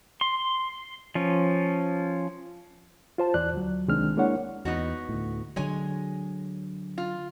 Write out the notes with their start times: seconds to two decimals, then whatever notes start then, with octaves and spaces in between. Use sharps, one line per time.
0.21 C6
1.15 F3 C#4
3.18 F4 C5 A5
3.34 E2 E3 D5 F#6
3.53 D2 F#3
3.88 C2 D#3 G#3 C4 D4 F6
4.17 G#3 A#3 D4 E4 C#5 F#5
4.65 E2 B3 D#4 F#4
5.09 D2 A2
5.56 D3 F#3 G#3 C#5 G#5
6.98 F4